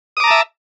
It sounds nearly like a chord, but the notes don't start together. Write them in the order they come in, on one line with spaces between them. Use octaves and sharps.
D#6 D6 A#5 A5 E5